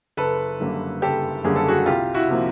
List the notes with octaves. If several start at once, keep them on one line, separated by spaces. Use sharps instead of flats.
F#1 A4 B4
F#2 D3 G3 A#3
F#1 G4 A4
F#2 D3 G3 A#3 G#4
A4
F#4 G#4
C2 F4 G4
E4 F#4
C3 F3 A#3